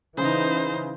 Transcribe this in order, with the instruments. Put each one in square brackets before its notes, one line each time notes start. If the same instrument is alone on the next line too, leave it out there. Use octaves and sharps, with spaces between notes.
[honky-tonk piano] C#3 [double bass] E3 [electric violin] D#4 C5